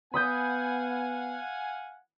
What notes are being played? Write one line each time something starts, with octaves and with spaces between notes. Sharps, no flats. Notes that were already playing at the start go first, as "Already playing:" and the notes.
B3 F5 F#5 G#5 B5 D#6 G6